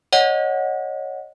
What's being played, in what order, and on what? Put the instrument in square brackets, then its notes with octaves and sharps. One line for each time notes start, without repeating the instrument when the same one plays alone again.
[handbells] C#5 D#5 F#5